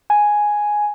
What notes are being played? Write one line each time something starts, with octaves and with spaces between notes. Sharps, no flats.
G#5